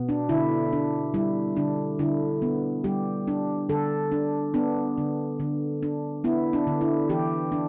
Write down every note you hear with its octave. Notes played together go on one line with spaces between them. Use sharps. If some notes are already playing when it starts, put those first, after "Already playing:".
Already playing: B2 B3
D4
D3 E4
D4
G3 E4
D3 D4
D3 E4
B3
G3 G4
D4
D3 A4
D4
B3 D4
D3
D3
D4
B3 E4
D4
D3
E4
E3 G4
D4